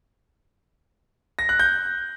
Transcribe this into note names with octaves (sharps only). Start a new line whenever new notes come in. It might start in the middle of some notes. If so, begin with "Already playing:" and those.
A#6
F#6
G6